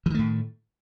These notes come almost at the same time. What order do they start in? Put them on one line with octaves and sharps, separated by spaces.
E3 D#3 A3 A2